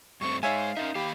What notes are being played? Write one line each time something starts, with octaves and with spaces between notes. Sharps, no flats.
G2 A3 C4 C#6
G#3 D#4 C#5 E5 F5 G#5
C#4 D#4 A#4 E5
D#3 A#3 G4 F5 B5